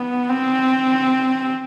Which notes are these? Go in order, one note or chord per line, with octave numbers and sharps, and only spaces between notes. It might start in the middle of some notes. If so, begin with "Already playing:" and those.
Already playing: B3
C4